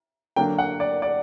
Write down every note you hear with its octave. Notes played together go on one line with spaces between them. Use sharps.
D3 F#3 A#3 D4 G5
F#5
D5
D5